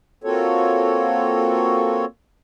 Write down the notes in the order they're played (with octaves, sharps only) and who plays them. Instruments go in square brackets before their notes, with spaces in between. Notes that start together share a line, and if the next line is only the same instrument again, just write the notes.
[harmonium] A#3 C4 F4 F#4 A4 C#5